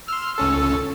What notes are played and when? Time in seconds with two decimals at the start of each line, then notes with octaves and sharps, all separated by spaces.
0.08 C6 E6 F6
0.38 C#2 C#4 A4